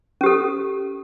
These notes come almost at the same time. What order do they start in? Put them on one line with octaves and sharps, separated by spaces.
C#4 G4 A4